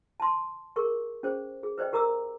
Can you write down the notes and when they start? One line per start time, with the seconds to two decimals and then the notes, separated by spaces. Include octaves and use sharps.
0.20 A5 C6
0.76 G#4 A#4 C#6
1.23 C#4 G#4 C5
1.63 G#4
1.78 B4 C5 D5 D#5 G5
1.93 G4 A#4 A#5 D6 E6